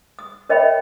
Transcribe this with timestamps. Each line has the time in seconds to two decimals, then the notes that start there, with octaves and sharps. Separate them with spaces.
0.19 D#6
0.49 A#4 C#5 D#5 E5 G5 B5